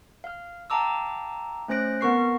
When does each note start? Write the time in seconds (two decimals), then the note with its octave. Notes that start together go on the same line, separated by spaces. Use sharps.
0.24 F5 F6
0.70 F5 G5 A5 A#5 D6 E6
1.68 A3 C#4 C5 F#6 A#6 D7
2.01 B3 C4 A#4 C#6 A#6 C7